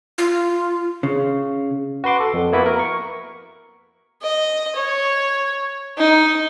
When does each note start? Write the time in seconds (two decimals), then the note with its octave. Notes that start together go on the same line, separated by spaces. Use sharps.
0.18 F4
1.03 C#3
2.04 F#4 B4 C6 D6
2.20 A4
2.34 F2
2.52 A#3 B3 E4 F#4 B4 E5
2.66 A#4
2.79 C#6
4.22 D#5
4.76 C#5
5.97 D#4